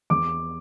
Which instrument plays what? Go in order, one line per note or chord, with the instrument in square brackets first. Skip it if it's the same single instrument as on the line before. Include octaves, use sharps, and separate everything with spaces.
[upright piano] E2 D6